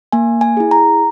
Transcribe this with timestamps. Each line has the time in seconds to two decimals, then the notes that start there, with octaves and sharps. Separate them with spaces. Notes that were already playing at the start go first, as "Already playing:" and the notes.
0.12 A#3 G#5
0.41 G#5
0.57 E4 G#4
0.71 A#5